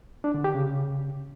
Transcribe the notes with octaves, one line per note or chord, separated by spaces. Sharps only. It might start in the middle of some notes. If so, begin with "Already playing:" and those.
D4
D3
G4
C#3